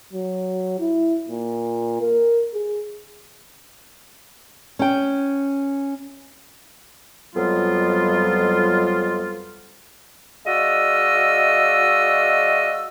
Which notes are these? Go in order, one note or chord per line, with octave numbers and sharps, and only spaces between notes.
F#3
E4
A#2
A#4
G#4
C#4 G5
F2 B2 F#3 G3 B3 F4
G#3 F#4 D5 D#5 F5 E6